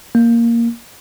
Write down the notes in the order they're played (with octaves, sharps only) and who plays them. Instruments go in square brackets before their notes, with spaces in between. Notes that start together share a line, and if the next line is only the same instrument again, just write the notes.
[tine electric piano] A#3